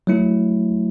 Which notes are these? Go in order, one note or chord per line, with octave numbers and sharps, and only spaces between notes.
F#3 A3 E4